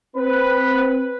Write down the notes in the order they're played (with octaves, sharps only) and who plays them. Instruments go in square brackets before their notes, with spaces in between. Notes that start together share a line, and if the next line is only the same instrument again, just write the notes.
[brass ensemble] C4 B4